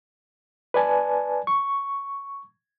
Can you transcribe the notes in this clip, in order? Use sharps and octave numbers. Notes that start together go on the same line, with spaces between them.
B4 D5 G#5 A5
C#6